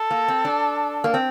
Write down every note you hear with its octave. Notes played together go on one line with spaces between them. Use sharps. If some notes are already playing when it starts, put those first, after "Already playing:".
Already playing: A4
A#3
C4
D4
A#3
C4